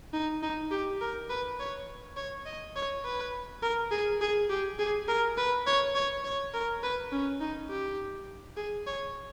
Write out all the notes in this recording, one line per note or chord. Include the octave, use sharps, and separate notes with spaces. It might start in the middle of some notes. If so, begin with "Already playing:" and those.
D#4
D#4
G4
A#4
B4
C#5
C#5
D#5
C#5
B4
A#4
G#4
G#4
G4
G#4
A#4
B4
C#5
C#5
C#5
A#4
B4
C#4
D#4
G4
G#4
C#5